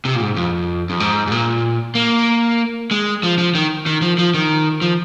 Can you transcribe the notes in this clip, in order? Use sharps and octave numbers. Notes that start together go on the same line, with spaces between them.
C3
A#2
G#2
F2
F2
G#2
G#2
A#2
A#3
G#3
F3
F3
D#3
D#3
F3
F3
D#3
F3